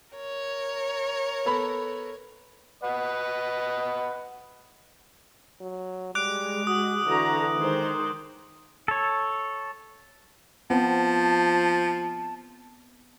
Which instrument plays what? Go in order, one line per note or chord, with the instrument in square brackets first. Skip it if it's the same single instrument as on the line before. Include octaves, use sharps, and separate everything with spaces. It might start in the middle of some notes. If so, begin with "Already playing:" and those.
[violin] A#4 C#5
[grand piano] B3 A4 B5
[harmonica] B4 D#5 F#5
[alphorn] F#3
[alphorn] G3 [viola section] G#3 [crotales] D6 F#6 D7
[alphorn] F#4 [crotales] D#6
[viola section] D3 F#4 A#5 [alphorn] E3
[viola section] D#3 G#3 C5
[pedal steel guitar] A4 C#5
[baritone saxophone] F3 [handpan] B3 C4 [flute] A5